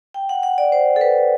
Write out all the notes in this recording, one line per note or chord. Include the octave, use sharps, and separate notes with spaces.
G5
F#5
F#5
D5
C5
A4
B4